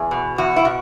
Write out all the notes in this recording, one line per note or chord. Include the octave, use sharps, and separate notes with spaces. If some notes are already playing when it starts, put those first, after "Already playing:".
Already playing: E2 G#4
B2
E2 F#4
E4
B2 F#4